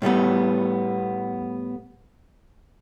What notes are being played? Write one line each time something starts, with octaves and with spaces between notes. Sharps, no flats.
A2 G3 A3 B3